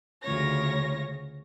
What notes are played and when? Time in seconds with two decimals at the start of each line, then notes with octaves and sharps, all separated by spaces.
0.23 D2 C#3 F4 C#5 A#6